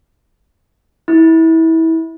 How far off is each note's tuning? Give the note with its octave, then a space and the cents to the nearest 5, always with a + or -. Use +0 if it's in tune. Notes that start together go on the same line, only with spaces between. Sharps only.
E4 -25